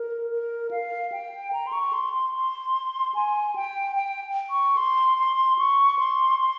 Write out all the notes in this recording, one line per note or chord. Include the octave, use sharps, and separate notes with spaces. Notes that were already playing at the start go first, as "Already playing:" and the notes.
Already playing: A#4
A#4
F5
G5
A#5
C6
C#6
C6
C6
C6
G#5
G5
G5
C#6
C6
C6
C#6
C6
C6